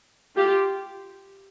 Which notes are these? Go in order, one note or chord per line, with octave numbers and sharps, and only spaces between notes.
F4 G4